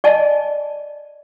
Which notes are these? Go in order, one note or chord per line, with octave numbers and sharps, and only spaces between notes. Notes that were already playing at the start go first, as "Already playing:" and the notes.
D5 D#5 G#5 A5